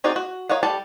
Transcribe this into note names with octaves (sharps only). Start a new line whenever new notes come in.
C4 D#4 F#4 G#4 D5
F#4
A#4 C#5 D#5 F5 F#5
G3 A4 A5